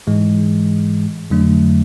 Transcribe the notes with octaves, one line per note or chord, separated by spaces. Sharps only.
G#2 E3 G#3
F2 D3 F#3 A3 D4